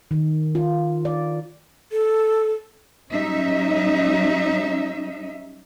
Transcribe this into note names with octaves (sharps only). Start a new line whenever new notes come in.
D#3
F4
D5
A4
F#3 G3 C#4 D#4 E5